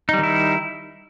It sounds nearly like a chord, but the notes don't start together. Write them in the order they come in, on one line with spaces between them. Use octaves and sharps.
D#4 G3 D#3 E4